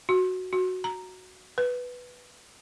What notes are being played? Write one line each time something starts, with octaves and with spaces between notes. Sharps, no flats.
F#4
F#4
A#5
B4